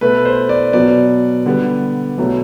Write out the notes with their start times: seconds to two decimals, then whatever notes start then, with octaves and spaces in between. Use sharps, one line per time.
0.01 B2 A3 B4
0.25 C5
0.49 D5
0.73 B2 F#3 B3 D5
1.45 D3 G3 B3
2.18 B2 F#3 A3